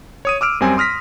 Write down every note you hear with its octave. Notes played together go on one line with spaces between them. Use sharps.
C#5 D#6 D#7
D6 E6 F6 D7
F#2 G3 C4 G#5
C6 D#6 F6 A#6 B6